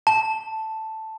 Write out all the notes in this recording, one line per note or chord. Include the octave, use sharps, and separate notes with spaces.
A5